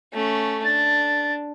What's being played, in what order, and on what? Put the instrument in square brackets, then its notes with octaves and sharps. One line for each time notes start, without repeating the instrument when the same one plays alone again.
[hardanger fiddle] A3 C#4
[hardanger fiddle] D4 [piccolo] A6